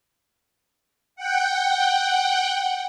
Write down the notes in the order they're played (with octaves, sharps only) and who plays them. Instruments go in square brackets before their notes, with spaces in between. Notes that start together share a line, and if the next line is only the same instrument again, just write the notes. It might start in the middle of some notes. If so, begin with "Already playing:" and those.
[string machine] F#5 G5